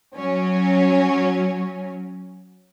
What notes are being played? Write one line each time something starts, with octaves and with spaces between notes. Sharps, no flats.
F#3 C#4